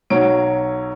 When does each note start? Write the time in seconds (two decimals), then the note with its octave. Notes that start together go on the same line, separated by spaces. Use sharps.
0.10 B1 F#3 C#5 D7